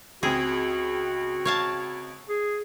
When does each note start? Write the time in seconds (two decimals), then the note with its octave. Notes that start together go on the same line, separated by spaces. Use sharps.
0.23 C#2 C4 F#4 G#4
1.45 C#5 F5 A5
2.29 G#4